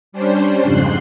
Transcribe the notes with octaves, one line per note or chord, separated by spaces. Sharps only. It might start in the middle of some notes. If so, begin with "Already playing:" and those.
G3 C#4 D4 C5
F2 G#2 C#3 C6 F#6 C7